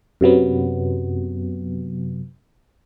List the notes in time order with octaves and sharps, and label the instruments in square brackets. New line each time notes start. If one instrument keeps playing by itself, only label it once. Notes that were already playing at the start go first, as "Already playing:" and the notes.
[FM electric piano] F#2 C3 F#3 B3